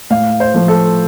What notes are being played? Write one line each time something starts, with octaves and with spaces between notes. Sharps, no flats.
A2 F5
C5
F3 A3
A4